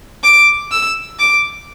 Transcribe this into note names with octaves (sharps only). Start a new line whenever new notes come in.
D6
E6
D6